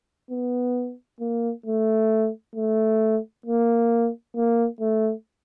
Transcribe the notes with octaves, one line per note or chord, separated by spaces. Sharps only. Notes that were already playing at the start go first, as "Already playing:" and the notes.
B3
A#3
A3
A3
A#3
A#3
A3